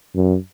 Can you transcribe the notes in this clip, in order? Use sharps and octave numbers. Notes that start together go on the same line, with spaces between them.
F#2